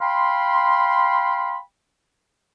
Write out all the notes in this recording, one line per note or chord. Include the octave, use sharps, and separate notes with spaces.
F5 G5 B5 C6